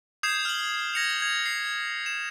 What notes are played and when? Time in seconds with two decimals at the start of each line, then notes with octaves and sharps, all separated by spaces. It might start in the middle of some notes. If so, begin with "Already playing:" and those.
0.23 D#6 G6 G#6 C7 E7
0.45 F6 F#7
0.94 G#6 A#6 C#7 F7
1.22 G#6 F7
1.45 C7
2.06 E7